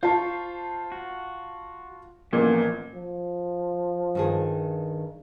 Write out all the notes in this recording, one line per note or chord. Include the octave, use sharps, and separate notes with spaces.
F4 C5 F5 A5 C#6
F#4
A1 A#2 F3 A#3 B3
F3
G2 D#3 G#4